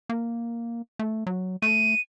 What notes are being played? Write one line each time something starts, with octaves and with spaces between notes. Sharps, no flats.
A#3
A3
F#3
A3 D#7